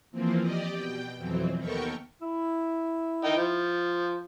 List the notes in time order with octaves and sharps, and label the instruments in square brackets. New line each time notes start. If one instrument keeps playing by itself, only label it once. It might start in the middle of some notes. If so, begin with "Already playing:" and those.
[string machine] E3 F3 A#3 C4
G4 D5 D#5
B2 G5
F2 B2 E3 F#3 C4
D#2 B3 A4 A#4 G5 C#6
[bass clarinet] E4
[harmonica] D#4 G5
F3